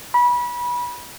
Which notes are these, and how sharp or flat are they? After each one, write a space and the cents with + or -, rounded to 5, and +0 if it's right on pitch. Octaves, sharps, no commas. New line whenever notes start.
B5 -25